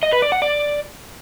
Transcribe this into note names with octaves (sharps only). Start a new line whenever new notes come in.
D#5
B4
D5
F#5
D5